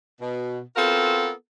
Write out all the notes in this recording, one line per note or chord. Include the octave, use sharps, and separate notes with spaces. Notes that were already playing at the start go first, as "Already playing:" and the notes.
B2
B3 C4 F4 F#4 A4 A#4